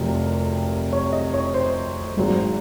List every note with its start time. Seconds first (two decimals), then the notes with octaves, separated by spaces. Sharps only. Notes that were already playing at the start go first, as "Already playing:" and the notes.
Already playing: F1 F2 C3 F#3 A#4
0.93 C#5
1.13 D#5
1.34 C#5
1.54 C5
2.17 G#1 G#2 F#3 A#3